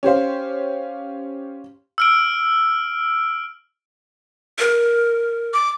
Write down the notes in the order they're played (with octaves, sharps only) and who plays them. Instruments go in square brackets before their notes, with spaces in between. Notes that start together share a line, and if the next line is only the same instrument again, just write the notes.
[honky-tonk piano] C#4 G4 C5 F5
[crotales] E6 F6 D7
[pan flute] A#4
[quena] D6